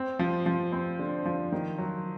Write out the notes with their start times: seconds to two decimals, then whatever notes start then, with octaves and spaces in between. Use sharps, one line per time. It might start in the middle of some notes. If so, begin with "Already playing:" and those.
Already playing: C4
0.19 F3
0.46 F3
0.72 C4
0.99 D3
1.25 F3
1.52 D#3
1.78 F#3